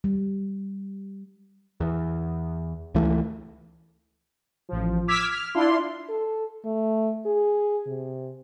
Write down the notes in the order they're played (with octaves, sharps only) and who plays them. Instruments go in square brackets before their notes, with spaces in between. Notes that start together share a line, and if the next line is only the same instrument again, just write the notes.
[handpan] G3
[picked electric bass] E2
C#2 E3 A3
[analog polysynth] A1 F3
D6 E6 F6 G#6 B6
F6
D4 E4 F4 C6
[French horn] A4
A3
G#4
C3